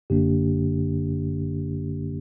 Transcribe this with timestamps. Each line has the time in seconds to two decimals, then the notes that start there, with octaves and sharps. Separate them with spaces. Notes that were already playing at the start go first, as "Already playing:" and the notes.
0.10 G1 F#2 D3 A#3 D4 G4